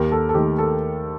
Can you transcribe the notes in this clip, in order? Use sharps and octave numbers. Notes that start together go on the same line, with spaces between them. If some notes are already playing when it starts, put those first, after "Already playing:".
Already playing: D#2 G4 A#4
A4
A4
D#3 A3 G4
A4